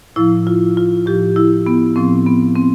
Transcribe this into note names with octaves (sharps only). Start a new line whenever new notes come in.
A2 F3 E4
F4
F4
A2 F3 G4
E4
B3
A2 F3 C4
B3
C4